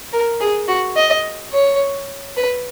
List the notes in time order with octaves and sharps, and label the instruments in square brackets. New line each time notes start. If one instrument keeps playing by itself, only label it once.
[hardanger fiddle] A#4
G#4
F#4
D#5
C#5
B4